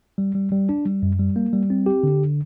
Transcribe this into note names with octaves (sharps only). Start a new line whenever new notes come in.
G3
G3
G3
D4
G3
F#2
G3
A#3
G3
C4
G4
D3